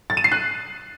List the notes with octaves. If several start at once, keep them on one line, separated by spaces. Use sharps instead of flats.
A6
D#7
C7
F#6